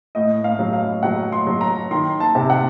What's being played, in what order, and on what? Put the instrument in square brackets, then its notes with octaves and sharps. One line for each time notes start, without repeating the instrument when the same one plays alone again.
[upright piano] A2 D#5
F5
F#3
F5
F#3 F#5
C6
F#3
A#5
D#3 C6
A5
C3
F#5